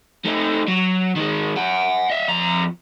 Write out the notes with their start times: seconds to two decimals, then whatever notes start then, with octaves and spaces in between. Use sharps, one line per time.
0.25 A3 D#4
0.68 F#3
1.16 D#3 G#3
1.56 F#5 G#5
2.10 D#5 E5
2.28 F2 A#5